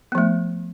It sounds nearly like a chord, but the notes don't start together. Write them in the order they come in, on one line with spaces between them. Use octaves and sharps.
B3 F3 A3